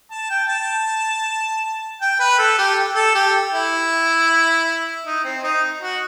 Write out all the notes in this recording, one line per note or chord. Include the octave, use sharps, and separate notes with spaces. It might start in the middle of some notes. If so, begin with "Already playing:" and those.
A5
G5
A5
G5
B4
A4
G4
A4
G4
E4
D#4
C4
D#4
F#4